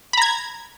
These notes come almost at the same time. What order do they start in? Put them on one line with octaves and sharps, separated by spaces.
B5 A#5 G#6